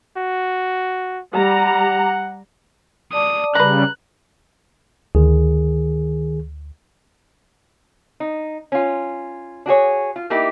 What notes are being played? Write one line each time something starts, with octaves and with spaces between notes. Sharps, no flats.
F#4
G3 F#5 A#5
D5 A5 D6 D#6
C#3 G3 B4 A#5 F#6
D2 D#3 G#4
D#4
C#4 F4
D4 F#4 G#4 C#5
F4
A#3 D#4 E4 G4 A#4